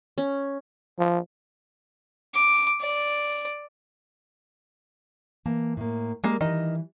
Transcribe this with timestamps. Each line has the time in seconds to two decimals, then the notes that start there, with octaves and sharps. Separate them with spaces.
0.18 C#4
0.99 F3
2.35 D6
2.81 D5
5.46 E3 A#3 A5
5.77 A2 A#3
6.24 G3 G#3 A#3
6.41 D#3 E3 G3 D#5